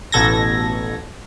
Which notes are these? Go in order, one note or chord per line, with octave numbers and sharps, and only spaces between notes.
A1 B2 A4 G#6 A#6